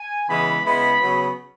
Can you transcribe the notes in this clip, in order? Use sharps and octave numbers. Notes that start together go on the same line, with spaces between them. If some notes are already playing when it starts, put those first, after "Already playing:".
Already playing: G#5
C#3 E3 G#3 B3 B5
C#3 G#3 B3 E4 B5
C#3 F#3 B3